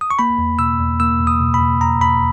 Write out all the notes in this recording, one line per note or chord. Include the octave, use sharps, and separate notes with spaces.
D#6
C#6
A#3 B5
E2
B2 E6
E2
A#3 E6
E2
D#6
B2
B5
E2
A#3 A#5
E2 B5